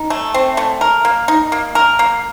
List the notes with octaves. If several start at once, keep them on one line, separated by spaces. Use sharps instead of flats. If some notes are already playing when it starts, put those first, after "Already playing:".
Already playing: D#4
A3
C4
A3
A#4
A#3
D#4
A#3
A#4
A#3